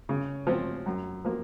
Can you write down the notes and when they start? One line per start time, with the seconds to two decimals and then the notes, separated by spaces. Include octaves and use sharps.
0.09 C#3
0.47 F3 C4
0.86 F#2
1.25 F3 A#3